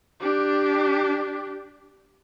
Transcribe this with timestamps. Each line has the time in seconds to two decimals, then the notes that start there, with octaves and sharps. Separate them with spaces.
0.21 D4 G4